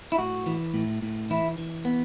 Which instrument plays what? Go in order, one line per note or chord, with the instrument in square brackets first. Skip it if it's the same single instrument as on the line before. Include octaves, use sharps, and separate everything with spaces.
[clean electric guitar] E4
A2 F#4
E3
A2
A2
E3 E4
E3
B3